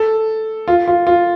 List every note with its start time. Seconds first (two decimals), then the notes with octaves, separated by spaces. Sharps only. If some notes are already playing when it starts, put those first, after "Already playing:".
Already playing: A4
0.68 F4
0.88 F4
1.07 F4